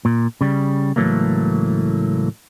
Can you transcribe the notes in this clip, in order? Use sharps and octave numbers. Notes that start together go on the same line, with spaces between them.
A#2
C#3 G3
C#2 A2 E3 F#3 A3 A#3